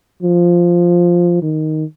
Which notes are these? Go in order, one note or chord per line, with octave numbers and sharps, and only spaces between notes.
F3
D#3